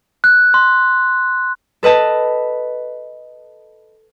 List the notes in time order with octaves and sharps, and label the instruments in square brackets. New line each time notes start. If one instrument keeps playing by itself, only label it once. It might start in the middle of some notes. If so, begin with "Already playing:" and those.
[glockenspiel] F#6
C6
[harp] A4 B4 D#5 A5